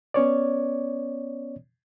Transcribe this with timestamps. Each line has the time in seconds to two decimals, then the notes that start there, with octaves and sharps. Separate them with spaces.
0.14 B3 C#4 C#5 D5